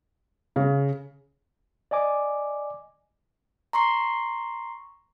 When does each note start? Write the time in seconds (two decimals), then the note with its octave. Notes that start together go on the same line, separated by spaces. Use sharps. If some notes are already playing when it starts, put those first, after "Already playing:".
0.56 C#3
1.91 D5 D#5 G#5 D6
3.73 A#5 C6 C#6 C7